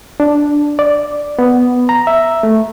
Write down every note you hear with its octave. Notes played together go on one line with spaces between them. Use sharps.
D4
D5
B3
A#5
E5
A3